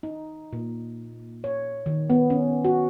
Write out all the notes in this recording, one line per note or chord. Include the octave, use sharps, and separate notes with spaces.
D#4
A#2
C#5
D#3
B3
C#4
F#4